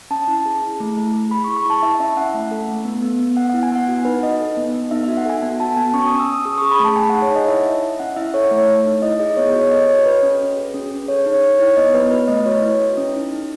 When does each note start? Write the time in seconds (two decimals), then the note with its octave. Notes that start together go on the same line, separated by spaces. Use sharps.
0.11 C#4 A5
0.28 E4
0.45 G#4
0.62 E4
0.80 A3
0.97 A3
1.13 G#4
1.31 G#4 B5
1.44 C#6
1.48 E4
1.57 C#6
1.65 E4 A5
1.83 E4 E5
1.99 C#4 E5
2.16 C#4 F#5
2.34 A3
2.51 A4
2.68 A3
2.85 B3
3.03 B3
3.19 B3
3.37 B3 F#5
3.49 F#5
3.54 E4
3.63 G#5
3.71 B3 F#5
3.88 F#4
4.05 D#4 B4
4.22 D#4 D#5
4.40 A4
4.57 B3
4.74 B3
4.91 D#4 E5
5.04 E5
5.08 F#4
5.17 F#5
5.25 A4 G#5
5.42 B3 G#5
5.60 F#4 A5
5.77 B3 G#5
5.94 C#4 C#6
6.07 D#6
6.11 C#4
6.20 E6
6.28 C#4 D#6
6.45 G#4 D#6
6.58 C#6
6.62 G#4
6.71 B5
6.79 A3 A5
6.96 G#4 G#5
7.10 F#5
7.14 D#4
7.22 C#5
7.30 D#4 D#5
7.48 E4 E5
7.65 E4
7.83 E4
8.00 C#4 F#5
8.16 E4 E5
8.34 A4 C#5
8.51 A3
8.68 A3
8.85 D#4
9.02 E4 D#5
9.19 G#4 D#5
9.37 B3 C#5
9.53 F#4 C#5
9.71 A4 D#5
9.88 A4 C#5
10.06 F#4 B4
10.23 C#4
10.40 F#4
10.56 G#4
10.74 C#4
10.91 G#4
11.08 A4 C#5
11.26 D#4
11.34 C#5
11.42 D#4
11.60 E4 C#5
11.77 B3 D#5
11.94 B3 B4
12.11 F#4 B4
12.28 A3 D#5
12.45 F#4 C#5
12.62 E4
12.79 A4
12.97 C#4
13.14 D#4
13.31 D#4